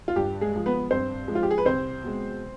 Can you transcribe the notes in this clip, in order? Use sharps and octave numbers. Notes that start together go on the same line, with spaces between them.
F4
G2 G4
G#3 G#4
F3 G#3
B3 B4
G2 C4 C5
F3 G#3
F4
G4
G#4
B4
C2 C4 C5
B2 G#3